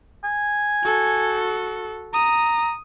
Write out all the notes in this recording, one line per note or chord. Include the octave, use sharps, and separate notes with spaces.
G#5
F#4 A4
A#5 D#6